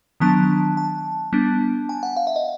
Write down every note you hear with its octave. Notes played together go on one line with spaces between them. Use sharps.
D#3 F#3 B3 D4 A5
A5
G3 B3 D4
G#5
F#5
F5
E5
D#5